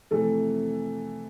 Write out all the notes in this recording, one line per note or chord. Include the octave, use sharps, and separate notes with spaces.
F2 C3 E3 A3 A4